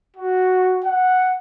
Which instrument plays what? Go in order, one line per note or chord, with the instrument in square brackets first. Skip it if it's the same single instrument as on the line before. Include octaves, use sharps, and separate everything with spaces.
[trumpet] F#4
F#5